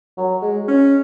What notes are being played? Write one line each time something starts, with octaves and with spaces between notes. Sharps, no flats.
F#3
G#3
C#4